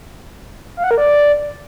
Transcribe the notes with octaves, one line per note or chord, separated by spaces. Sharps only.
F5
F#5
A#4
D5